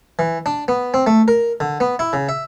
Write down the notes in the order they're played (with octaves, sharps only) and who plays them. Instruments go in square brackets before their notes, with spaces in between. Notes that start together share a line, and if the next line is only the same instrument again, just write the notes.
[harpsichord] E3
D4
B3
C4
A3
A#4
D3
B3
E4
C#3
E5